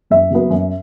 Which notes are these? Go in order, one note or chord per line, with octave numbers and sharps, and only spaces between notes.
F#2 E5
C#3 F#3 B3
F#2